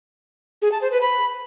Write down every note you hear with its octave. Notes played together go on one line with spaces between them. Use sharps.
G#4
A5
C5
B4
B5